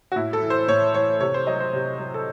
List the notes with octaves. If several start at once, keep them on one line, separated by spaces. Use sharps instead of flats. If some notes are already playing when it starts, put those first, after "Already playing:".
F#4
A2 E4
A4
E3
C5
A2 C#5
E3 C#5
C3 C#5
C5
F#3 D#5
C5
C3
F#3
A4